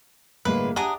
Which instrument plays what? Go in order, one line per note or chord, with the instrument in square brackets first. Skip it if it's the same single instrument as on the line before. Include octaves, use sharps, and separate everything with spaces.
[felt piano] G1 A#3 [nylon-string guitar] A2 D3 G#3 [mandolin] B4
[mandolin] D4 A#5 D#6 [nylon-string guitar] G4 [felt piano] E5 F#5 G#5